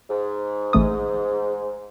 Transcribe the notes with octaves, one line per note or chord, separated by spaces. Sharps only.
G#2
A1 A3 D#6